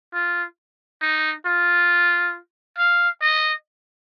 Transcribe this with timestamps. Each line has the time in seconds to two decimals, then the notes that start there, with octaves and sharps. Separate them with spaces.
0.13 F4
1.02 D#4
1.46 F4
2.78 F5
3.22 D#5